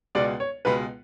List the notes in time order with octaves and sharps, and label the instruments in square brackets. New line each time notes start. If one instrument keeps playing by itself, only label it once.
[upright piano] C#2 B2 G#3 B3 [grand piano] D5
[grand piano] C#5
[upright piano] C#2 B2 G#3 B3 [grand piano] B4